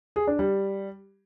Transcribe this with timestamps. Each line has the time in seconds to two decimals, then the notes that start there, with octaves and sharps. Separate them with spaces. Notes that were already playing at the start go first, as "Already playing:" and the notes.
0.16 G#4
0.27 D4
0.39 G3